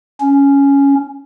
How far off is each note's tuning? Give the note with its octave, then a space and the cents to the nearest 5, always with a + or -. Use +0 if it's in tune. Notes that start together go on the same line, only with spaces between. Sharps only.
C#4 +5